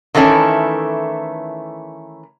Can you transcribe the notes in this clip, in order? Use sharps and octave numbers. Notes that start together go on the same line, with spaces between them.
D#3 E3 A3 C#4 E4